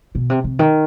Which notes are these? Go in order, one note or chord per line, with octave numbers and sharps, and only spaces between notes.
B2
C3
C3
D#3